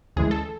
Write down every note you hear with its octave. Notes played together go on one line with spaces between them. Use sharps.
D2 C#3 E3 G#3 G#4
A4